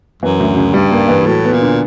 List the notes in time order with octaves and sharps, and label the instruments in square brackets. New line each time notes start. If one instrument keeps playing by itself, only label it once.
[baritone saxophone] F#2 [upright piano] E3
[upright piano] D2
C#3
[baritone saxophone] G2 [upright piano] G3
[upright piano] A#3
E3
[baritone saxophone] A2 [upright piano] F#3
[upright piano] B3
[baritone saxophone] A#2
[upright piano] D3